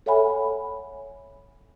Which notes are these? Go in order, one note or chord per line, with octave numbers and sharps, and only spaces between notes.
A4 C#5 E5 F#5 G#5 B5